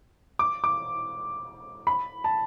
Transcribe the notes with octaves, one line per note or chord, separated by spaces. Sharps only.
D6
D6
B5
A5